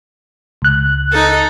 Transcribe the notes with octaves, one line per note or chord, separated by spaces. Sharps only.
C#2 F#6
D#4 A4